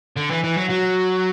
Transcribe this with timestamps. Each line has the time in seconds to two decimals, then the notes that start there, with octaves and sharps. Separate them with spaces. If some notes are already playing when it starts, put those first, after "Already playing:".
0.16 D3
0.30 E3
0.44 E3
0.57 F#3
0.70 F#3